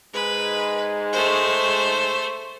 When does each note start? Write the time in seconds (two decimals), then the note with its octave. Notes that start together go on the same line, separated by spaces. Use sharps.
0.13 G#2 G#3 B4
1.12 A3 C5